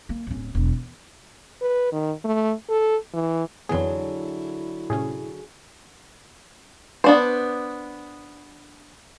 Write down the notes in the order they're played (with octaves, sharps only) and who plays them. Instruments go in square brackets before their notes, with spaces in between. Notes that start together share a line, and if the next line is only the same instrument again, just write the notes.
[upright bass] A#3
D1 C#4
E1 F#2
E2
[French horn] B4
D#3
A3
A4
E3
[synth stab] F2 E3 B3 [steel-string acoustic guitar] D3 F#3 [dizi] E4 [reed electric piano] G#4
[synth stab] A2 C3 C#4 [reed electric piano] G#4
[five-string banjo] B3 D4 C5